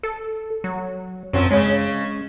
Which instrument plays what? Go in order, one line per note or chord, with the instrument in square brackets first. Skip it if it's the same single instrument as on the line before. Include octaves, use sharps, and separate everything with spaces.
[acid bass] A4
F#3
[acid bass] F#2 [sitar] F3 C4 C#4
[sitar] C#3 C#4 [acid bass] G#3